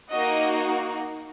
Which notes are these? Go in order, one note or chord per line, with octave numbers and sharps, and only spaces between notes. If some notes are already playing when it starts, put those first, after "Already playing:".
A#3 D#4 F#4 D#5